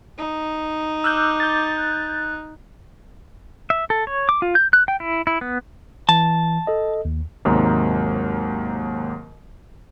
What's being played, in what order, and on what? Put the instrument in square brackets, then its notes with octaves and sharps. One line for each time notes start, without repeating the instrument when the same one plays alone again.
[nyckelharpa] D#4
[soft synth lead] D6 [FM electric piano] E6 F#6 G6
[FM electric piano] G6 A6
[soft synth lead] F#6
[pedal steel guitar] E5
A4
C#5
D6
F4
G6
F#6
G5
E4
E4
B3
[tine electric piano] E3 [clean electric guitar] A5
[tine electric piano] A4 D#5
D#2
[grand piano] D#2 G#2 C3 F#3 A#3